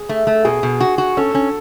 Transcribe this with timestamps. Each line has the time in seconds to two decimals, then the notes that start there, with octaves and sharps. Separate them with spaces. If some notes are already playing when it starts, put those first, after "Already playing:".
Already playing: G#4
0.09 A3
0.27 A3
0.45 B2 G#4
0.63 B2
0.80 F#4
0.98 F#4
1.17 C#4 A4
1.35 C#4